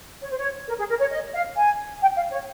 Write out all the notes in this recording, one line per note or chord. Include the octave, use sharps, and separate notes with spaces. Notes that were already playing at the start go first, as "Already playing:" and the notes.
C#5
C5
C#5
A#4
G#4
A#4
C#5
D#5
F5
G#5
G5
F5
C#5